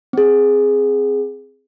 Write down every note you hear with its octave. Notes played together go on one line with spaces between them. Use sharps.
C4 G#4